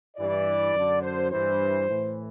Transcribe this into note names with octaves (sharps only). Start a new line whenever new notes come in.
G2 E3 D5
F#2 D3
C5
G2 E3 C5
A2 E3